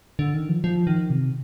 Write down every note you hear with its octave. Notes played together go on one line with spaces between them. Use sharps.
D3
D#3
F3
F3
D#3
C3